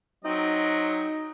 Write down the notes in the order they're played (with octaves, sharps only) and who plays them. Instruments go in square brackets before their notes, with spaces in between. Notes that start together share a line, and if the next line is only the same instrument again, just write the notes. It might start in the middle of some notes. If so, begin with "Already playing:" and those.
[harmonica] F#3 C4 D#5 [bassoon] D#4